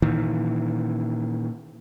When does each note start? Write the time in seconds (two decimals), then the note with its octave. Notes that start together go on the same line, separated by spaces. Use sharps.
0.02 A#2 D#3 E3